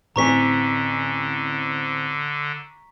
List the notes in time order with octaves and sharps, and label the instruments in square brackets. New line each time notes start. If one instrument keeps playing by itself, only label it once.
[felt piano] A1 C4 G#5 [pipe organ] D3 [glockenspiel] A#5 C#6 B6